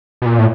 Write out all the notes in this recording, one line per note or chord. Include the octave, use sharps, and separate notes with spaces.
B2
A#2
A2